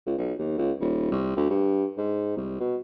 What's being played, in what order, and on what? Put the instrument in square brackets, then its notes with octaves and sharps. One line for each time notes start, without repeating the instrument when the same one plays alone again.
[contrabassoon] C#2
B1
D#2
C#2
D#1
C2
D2
G2
G#2
C2
B2